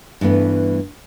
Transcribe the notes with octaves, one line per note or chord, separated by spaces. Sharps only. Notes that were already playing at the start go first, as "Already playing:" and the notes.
G2 E3 A3 B3